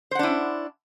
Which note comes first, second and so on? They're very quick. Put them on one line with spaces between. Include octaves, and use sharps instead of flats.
C5 F#5 D4 E4 C#4